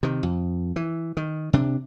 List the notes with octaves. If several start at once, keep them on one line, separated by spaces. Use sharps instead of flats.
C3 D#3
F2
E3
D#3
C3 D4